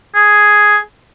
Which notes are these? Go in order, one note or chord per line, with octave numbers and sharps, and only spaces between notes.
G#4